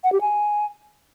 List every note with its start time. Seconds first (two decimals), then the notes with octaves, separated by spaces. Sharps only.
0.04 F#5
0.12 G4
0.21 G#5